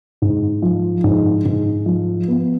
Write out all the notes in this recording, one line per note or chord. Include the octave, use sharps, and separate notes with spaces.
G#2
F3
G#2
G#2
F3
B3